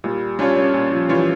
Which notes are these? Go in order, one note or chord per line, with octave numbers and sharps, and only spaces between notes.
A#2 G3
G3 C#4 D4 F4 C#5
C#4
A#2
F3
E3 G3 D4 F4 C#5